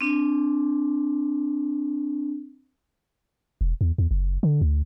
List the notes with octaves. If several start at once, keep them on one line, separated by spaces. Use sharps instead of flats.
C4 D4
E1
E2
E2
F#1
D3
D2